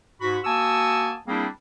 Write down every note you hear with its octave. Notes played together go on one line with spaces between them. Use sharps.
G#2 F#4 B5
A#3 F#4 G#5 A5 D#6 E6
G3 A#3 C4 D4 E4 G#4